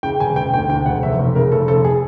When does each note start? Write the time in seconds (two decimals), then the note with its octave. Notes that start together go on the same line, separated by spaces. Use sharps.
0.03 C#3 G5
0.20 E1 G#5
0.36 E1 G5
0.54 D2 G5
0.69 D2 G5
0.86 E1 F#5
1.03 F1 E5
1.19 F1
1.35 C#3 A#4
1.52 F1 A4
1.68 F1 A4
1.85 G#4